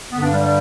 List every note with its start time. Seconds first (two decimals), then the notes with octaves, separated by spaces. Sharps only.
0.12 G2 D3 B3
0.22 D4
0.33 G3
0.43 G3